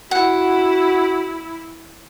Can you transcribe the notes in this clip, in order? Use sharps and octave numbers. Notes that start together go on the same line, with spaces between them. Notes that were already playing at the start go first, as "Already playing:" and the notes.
E4 F#4 F#5